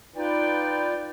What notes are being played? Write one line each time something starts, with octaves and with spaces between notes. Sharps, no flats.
D#4 F4 B4 D5 G5